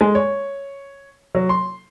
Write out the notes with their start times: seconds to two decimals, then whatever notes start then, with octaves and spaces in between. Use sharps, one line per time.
0.01 G#3
0.15 C#5
1.35 F#3
1.49 C6